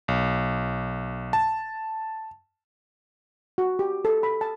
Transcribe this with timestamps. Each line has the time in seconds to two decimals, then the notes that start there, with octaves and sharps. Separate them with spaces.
0.08 B1
1.33 A5
3.58 F#4
3.79 G4
4.05 A4
4.23 B5
4.41 A5